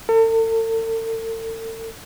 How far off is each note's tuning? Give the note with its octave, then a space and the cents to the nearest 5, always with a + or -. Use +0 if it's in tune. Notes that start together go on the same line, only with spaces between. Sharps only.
A4 +40